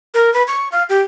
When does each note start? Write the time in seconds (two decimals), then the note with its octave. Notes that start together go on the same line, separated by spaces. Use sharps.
0.14 A#4
0.34 B4
0.48 C#6
0.72 F5
0.89 G4